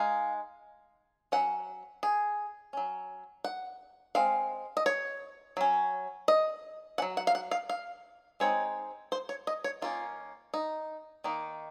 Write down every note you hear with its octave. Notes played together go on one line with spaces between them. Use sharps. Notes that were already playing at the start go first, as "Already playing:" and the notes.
Already playing: G#3 D#4 F5
F#3 C#4 F#5
G#4
F#3 C#4
F#5
G#3 C4 F5
D#5
C#5
F#3 C#4
D#5
C#4 F#5
F#3
F#5
F5
F#5
F5
F5
G#3 C4 D#4 C#5
C5
C#5
D#5
C#5
D#3 A#3 C#4 F4
D#4
D#3 A#3 D#4